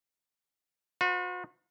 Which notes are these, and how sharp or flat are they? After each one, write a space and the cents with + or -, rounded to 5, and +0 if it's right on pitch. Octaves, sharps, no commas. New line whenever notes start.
F#4 -45 B4 +45